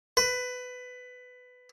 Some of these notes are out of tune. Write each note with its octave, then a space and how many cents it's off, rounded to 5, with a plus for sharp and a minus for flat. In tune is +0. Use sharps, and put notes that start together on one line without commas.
B4 +15